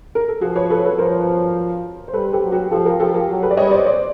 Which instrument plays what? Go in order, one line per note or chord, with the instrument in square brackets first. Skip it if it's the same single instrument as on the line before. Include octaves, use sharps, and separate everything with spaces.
[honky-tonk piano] A#4
A4
[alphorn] F3 [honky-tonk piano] F#4 G#4
[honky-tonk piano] B4 C#5
A4 B4
A4 B4
[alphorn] F3 [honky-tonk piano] A#4 C5
[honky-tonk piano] C5
[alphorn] G3 [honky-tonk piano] A4 B4
[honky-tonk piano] G4 A4
[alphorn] F#3
[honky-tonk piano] F#4 G#4
[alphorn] F3 [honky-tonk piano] G4 A4
[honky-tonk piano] G#4 A#4
[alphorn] F3 [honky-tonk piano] G4 A4
[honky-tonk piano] G#4 A#4
[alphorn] F#3
[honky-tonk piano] A4 B4
D5
[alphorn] G3 [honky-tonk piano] C#5 D#5
[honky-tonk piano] C5 D5
C5 D5